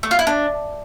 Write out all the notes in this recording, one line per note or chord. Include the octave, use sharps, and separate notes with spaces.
A3
F4
E4
D4